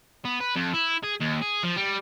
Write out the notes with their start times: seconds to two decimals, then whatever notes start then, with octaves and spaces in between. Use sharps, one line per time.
0.25 B3
0.41 B4
0.56 F2
0.74 E4
1.03 G#4
1.20 D#2
1.41 G#4
1.63 F3
1.76 G3